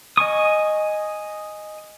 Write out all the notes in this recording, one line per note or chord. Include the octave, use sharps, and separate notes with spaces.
D#5 G#5 C#6 D#6